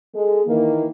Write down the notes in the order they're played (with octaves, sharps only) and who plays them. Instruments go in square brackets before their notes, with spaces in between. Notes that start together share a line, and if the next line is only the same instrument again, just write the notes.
[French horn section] G#3 A4
D#3 E3 A#3